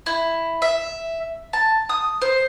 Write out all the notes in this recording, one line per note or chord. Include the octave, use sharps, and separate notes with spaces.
E4
E5
A5
D#6
C5